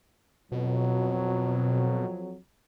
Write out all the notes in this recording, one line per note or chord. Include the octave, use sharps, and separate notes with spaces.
F2 B2 F#3